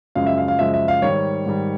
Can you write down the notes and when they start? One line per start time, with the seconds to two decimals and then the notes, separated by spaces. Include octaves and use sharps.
0.15 F#2 C#3 F3 G#3 F5
0.26 E5
0.38 F5
0.48 F5
0.59 F#2 C#3 F3 G#3 E5
0.74 E5
0.88 F5
1.02 G#2 D#3 G3 C#5
1.46 G#2 D#3 G3